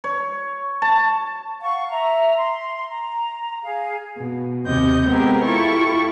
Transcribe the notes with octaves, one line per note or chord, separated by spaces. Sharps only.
C#5
A5
F5 F#5 C#6
E5 A#5
C6
A#5
G#4 F5
B2
D#2 C3 D#5 G6
G#3 B3 C4 G4 G#4 A#4
E4 F4 G4 A4 C#6